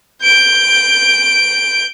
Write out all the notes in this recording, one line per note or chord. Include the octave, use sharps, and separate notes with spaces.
G6 D7